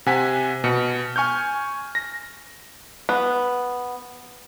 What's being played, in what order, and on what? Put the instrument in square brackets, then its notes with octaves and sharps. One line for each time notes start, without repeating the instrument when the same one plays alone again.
[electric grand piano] C3 F#5 G#5 B6
B2 C#7
G#5 C#6 F6 G6
A#6
[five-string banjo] B3